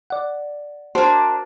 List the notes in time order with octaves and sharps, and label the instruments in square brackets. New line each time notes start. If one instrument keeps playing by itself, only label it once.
[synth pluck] D5 F#5
[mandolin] A#3 D4 [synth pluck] F#4 [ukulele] C5